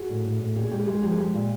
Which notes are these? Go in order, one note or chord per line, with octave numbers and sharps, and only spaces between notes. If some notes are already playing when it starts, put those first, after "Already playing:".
Already playing: F#4 G#4
A2
A2
A2
A#2 G4
G#4
G#3 G4
G#4
G#3 G4
G#4
F3 G4
G#4
G#3 G4
A#2